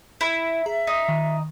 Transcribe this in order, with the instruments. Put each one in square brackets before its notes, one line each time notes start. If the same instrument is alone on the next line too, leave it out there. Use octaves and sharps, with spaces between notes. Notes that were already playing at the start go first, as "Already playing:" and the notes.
[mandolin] E4
[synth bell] G#4 A#5 [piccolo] E5
[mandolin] D#4
[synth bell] D#3